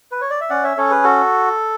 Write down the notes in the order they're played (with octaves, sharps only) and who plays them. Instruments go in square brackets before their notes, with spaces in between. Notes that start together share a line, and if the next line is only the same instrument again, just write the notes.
[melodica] B4
C#5
D5
E5
C#4 D5 F#5
C#5 E5
C#4 A4 C#5
G#4 B4
F#4 A4